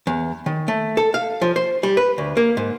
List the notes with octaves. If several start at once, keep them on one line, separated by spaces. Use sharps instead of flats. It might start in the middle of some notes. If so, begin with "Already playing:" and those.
E2
D#3
A3
A4
F5
F3
C5
G3
B4
D2
A#3
G#2